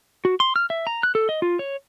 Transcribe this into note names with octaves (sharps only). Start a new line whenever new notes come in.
F#4
C6
F6
E5
A#5
F#6
A4
D#5
F4
C#5